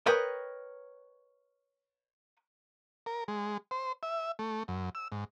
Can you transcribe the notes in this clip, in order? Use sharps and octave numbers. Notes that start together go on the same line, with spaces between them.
A#4 B4 C#5 D#5 G5
A#4
G#3
C5
E5
A3
F#2
E6
G#2